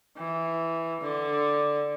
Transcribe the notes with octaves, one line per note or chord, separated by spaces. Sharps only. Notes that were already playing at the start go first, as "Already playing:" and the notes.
E3
D3